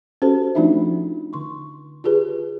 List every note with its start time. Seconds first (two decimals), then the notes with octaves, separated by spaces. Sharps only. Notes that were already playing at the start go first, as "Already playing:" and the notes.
0.22 C#4 F#4 G4 A4 C5
0.55 F3 A3 D4 D#4 F4 E5
1.33 D3 C6 C#6
2.04 F4 G4 G#4 B4